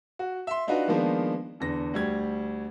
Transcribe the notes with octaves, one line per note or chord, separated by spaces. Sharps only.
F#4
E5 C6
D4 D#4 F4 F#4 B4
D#3 F3 G#3 A#3 B3 D4
E2 D3 A#6
D2 G3 G#6